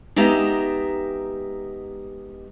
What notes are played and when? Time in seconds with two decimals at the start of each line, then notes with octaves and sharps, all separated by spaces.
0.16 G#3 B3 D#4 G4 E5 A#5